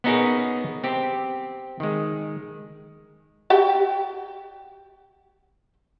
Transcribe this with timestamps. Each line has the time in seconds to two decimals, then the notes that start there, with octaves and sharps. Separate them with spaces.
0.04 B3 C#4 D#4 F#4 G#4 A#4
0.84 C4 G4
1.80 D#3 G#3
3.50 F#4 G4 G5